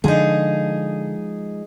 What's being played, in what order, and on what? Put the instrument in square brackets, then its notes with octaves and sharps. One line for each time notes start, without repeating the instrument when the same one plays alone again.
[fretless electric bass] D3 [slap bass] F3 G#3 [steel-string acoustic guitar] D#4 G#4